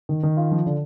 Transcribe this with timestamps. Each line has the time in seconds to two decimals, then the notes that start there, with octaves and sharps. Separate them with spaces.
0.09 D#3
0.23 D#3
0.37 F4
0.51 F3
0.66 D3